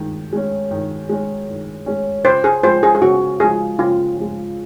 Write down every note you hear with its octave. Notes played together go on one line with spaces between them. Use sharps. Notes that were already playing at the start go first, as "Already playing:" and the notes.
Already playing: D#3 G#3
G#3 C#4
D#3
G#3 C#4
D#3
G#3 C#4
C#3 C5
G#4
F3 G#3 C5
G#4
G#4
C#3 F#4
F3 G#3 G#4
C#3 F4
F3 G#3